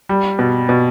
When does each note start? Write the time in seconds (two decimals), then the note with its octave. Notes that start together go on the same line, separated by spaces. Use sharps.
0.09 G3
0.39 B2
0.69 B2